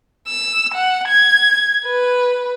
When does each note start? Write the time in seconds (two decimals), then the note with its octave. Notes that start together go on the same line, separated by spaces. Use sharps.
0.28 E6
0.74 F#5
1.09 G#6
1.87 B4